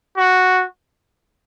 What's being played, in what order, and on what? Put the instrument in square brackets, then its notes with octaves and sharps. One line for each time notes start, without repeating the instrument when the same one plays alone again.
[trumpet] F#4